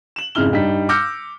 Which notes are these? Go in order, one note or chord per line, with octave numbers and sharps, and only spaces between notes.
E7 F#7
F2 G#2 C#3 E4 F6 G7
G2 G3 D#4 B6
D6 E6 F6 G6 A#6 C#7